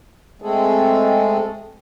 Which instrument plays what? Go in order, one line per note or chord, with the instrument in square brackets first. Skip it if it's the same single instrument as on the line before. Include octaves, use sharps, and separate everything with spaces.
[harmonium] G#3 A3 C4 G#4 A4